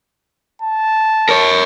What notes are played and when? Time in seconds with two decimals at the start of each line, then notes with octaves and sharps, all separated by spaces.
0.62 A5
1.29 A#4 C#5